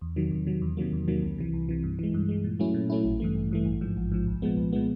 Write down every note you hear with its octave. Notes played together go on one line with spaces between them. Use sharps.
E2
C3 D#3 F#3
E2
C3 D#3 F#3
E2
C3 D#3 F#3 A#3
E2
C3 D#3 F#3 A#3
C2
C3 E3
C2
C3 E3
G2
E3 G#3
G2
E3 G#3
A#2
F#3 A3 C#4 E4
A#2
F#3 A3 C#4 E4
A1
G2 E3 A3
A1
G2 E3 A3
A1
G#2 F3
A1
G#2 F3
C2
A#2 F3 G#3 B3
C2
A#2 F3 G#3 B3